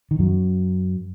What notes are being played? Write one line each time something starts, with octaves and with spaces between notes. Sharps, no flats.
D#3
F#2 F#3